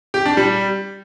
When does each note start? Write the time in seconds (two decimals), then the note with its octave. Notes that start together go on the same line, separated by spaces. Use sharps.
0.14 G4
0.26 D4
0.37 G3